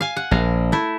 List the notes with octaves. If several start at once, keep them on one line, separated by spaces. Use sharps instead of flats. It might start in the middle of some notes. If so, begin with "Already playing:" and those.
F5 G#5
F#5
A#1 A#4 F5
A3 E4